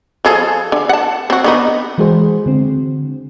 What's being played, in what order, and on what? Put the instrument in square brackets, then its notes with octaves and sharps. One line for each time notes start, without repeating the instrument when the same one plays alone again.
[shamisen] F3 G#4 A4
D3
F#5 A5
C4 F#4
D3 B3 D#4
[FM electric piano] E3 G#3 F#4 G#4 C5
D3 C4